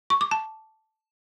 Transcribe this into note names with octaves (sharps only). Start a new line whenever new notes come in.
C#6
D6
A5